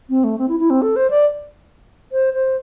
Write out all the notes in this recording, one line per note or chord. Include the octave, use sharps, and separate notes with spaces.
C4
A3
C4
E4
E4
C4
A4
C5
D5
C5
C5